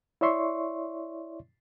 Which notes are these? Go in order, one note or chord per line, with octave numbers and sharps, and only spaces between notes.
E4 C#5 D5 E5 C6 C#6